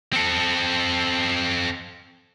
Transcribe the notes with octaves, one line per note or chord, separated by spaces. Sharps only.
C4 A4